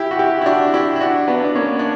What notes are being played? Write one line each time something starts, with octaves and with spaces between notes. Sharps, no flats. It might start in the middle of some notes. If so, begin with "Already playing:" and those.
Already playing: E4 G4
F#4
E4 G4
E4
D4 F#4
E4 G4
E4
D4 F#4
B3 D4
D4
A#3 C#4
D4